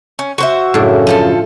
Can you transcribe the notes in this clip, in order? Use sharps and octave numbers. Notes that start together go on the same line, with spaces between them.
C#4
F#4 C5 E5
F#2 A2 C#3 D4
F3 F4 A4